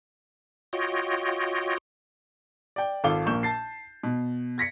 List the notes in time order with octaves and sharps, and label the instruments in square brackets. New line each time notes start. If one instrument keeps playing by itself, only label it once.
[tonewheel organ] F4 F#4 C#5 D#5 G5
[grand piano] D5 G5
G#1 F4 A4 F5 D6 G7
A#1 A#3 C#6 G6 E7
A5 A6 C7
B2
G#6 A#6 B6 C#7